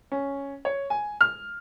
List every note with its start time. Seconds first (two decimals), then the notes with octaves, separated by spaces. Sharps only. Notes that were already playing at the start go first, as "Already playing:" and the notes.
0.12 C#4
0.65 C#5
0.90 G#5
1.21 F6